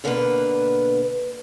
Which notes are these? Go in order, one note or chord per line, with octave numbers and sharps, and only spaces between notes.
B2 D3 A#3 B3 D4 B4